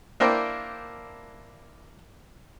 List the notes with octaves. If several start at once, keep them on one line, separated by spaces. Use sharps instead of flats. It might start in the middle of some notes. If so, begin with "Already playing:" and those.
A#3 D4 E4 A#4 C5 G5